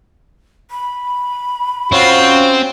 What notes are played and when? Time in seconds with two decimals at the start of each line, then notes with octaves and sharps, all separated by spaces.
0.71 B5
1.92 C4 C#4 F4 F#4